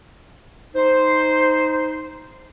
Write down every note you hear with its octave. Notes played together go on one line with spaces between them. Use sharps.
D#4 C5